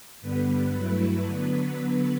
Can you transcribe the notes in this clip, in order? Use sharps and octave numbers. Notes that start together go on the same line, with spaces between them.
G2 D3 G3 B3 B4
G2 F#3 A3 E4
D3 F#3 B3